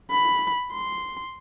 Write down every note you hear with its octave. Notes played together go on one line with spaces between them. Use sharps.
B5
C6